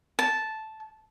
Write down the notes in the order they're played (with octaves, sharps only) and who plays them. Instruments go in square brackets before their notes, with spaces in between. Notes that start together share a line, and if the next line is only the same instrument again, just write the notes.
[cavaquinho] A5